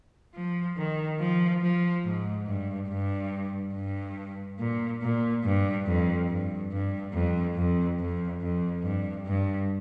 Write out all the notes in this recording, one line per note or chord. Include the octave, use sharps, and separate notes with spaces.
F3
D#3
F3
F3
G#2
G2
G2
G2
A#2
A#2
G2
F2
G2
G2
F2
F2
F2
F2
G2
G2